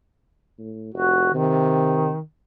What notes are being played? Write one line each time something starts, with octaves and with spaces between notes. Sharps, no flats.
A2
F1 F#4
C3 D#3